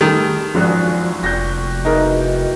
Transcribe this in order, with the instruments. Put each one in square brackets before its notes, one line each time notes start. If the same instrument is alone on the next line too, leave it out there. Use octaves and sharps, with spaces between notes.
[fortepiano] D#3 [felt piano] G3 A3 G#4 [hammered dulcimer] C6
[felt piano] G#1 F#2 [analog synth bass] F3 [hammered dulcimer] D4 F#4 G#4
[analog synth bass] F1 [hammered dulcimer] A#2 F#4 G4 [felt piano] G6 A#6
[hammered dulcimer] B2 E3 [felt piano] D#4 G#4 A#4